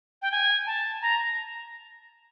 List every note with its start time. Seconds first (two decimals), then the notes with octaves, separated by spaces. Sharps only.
0.22 G5
0.32 G#5
0.66 A5
1.02 A#5